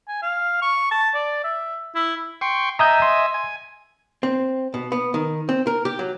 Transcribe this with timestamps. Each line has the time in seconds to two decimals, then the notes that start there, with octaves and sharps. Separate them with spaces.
0.08 G#5
0.22 F5
0.62 C#6
0.91 A5
1.14 D5
1.44 E5
1.95 E4
2.41 G5 C6 C#6
2.79 D#5 E5 G#5 A#5 D#6 G6
3.02 C6
3.34 G#5
4.23 C4
4.74 B2
4.92 B3
5.14 D#3
5.49 C4
5.67 A#4
5.85 G4
5.99 F#3